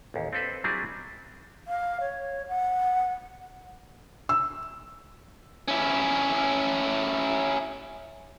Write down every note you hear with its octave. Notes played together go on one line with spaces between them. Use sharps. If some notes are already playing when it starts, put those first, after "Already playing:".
A1 D#2
C4 D4 A4 B4 C5
F#3 G3 C4 D4 E4 G#4
F5
C#5
F#5
E6
C#4 E4